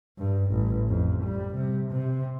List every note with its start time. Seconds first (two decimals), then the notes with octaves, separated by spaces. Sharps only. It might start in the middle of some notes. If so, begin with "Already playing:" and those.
0.18 G2
0.51 A1
0.88 F2
1.24 G3
1.56 C3
1.91 C3